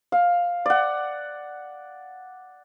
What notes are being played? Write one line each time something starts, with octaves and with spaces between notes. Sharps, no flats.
F5
D5 F#5